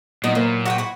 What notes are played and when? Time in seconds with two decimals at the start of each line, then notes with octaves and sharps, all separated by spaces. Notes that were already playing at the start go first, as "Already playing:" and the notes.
0.24 A#2 F#3 B3 D#4 E4
0.35 F#3 A#3 E4 C5
0.66 F#4 F#5 G5
0.78 E4 F#4